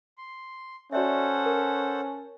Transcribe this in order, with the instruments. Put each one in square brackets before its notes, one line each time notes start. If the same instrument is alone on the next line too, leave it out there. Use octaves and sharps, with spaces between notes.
[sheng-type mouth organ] C6
[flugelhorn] C#4 [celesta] F#4 D5 E5 [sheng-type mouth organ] A4 C5 F#5
[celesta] A#4